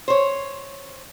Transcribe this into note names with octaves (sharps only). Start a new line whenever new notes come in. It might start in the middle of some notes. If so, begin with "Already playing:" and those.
C5 C#5